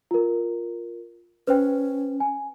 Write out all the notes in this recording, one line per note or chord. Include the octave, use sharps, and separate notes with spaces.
F4 A#4
C#4 B4 C5 G5
G#5